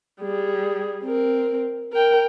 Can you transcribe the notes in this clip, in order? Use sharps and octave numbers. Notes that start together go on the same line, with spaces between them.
G3 G#4
C4 A#4
A#4 G5